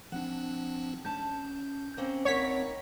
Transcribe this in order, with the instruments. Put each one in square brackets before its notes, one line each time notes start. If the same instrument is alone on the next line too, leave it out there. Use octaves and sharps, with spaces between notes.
[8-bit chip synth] F3 C4 D4 [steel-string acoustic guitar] F#5
[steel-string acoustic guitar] C#4 A5 [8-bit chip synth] G6
[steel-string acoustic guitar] A#3 C4 C#4
[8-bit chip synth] A#1 C4 F#5 [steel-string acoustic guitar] D#2 A#4 [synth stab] C#5 B6